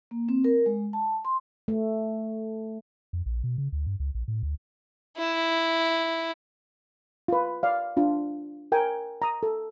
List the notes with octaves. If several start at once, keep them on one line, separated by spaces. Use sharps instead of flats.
A#3
C4
A#4
G#3
A5
C6
A3
F2
A#1
B2
C#3
D2
G2
C#2
A#1
A2
D2
E4
F4 B4
D5 F5
D4 F4
A#4 G5 G#5
A#5 D#6
A4